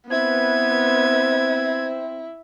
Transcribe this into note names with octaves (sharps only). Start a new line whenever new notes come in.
B3 C4 E4 B4 G#6